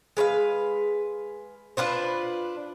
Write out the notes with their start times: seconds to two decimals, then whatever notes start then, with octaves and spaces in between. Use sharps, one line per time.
0.17 G#3 B4 C#5 F5
1.77 D4 F4 B4 C5